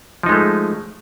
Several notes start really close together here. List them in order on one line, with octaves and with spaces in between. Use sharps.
F3 D#4 G#3 A3